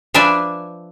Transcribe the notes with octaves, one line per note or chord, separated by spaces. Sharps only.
F3 D4 B4 D5 E5 G#5